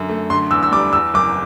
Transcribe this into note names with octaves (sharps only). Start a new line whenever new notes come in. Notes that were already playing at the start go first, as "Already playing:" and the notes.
Already playing: F#2 D3
A3
D3 C6
E2 E6
E6
G3 D6
E2 E6
F#1 D6